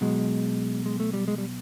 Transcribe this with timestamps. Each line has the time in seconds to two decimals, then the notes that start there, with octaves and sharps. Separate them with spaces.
0.01 B2 F#3 G#3
0.86 G#3
1.00 A3
1.13 G3
1.28 G#3
1.38 G3